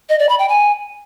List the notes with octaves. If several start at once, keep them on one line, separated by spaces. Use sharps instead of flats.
D#5
D5
B5
G5
G#5